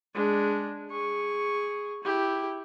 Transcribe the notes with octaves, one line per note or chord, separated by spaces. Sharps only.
G#3 D4
G#4 C#6
E4 G4